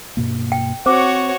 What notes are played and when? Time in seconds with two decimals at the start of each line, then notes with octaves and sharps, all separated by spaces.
0.17 G2 B2 A#3
0.52 G5
0.86 C4 F#4 C5 C#5 D6